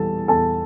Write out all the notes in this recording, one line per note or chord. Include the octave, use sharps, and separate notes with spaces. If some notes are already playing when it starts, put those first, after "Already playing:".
Already playing: E2 E3 G3 A4 A5
E2 A4 A5